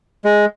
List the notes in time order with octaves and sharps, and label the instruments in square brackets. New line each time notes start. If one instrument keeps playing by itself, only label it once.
[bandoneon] G#3